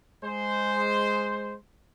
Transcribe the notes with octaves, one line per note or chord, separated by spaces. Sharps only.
G#3 C5